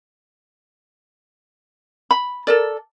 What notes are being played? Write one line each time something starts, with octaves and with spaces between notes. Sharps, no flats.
B5
A4 A#4 D5